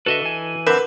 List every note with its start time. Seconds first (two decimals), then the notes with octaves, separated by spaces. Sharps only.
0.06 D3 F#4 A4 B4 D#5 E5
0.21 E3 G#5
0.67 D3 C4 A#4 B4 E5 F#5